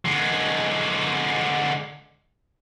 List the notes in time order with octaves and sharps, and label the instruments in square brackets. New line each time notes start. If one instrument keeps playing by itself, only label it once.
[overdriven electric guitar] D3 G#3